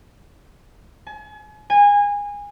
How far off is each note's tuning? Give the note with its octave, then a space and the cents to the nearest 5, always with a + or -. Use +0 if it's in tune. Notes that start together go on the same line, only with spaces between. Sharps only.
G#5 +40
G#5 -25